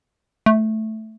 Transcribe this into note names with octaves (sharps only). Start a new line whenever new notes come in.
A3